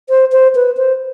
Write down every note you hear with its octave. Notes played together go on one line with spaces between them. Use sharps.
C5
C5
B4
C5